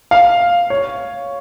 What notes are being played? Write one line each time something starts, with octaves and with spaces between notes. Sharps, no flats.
F5
C#5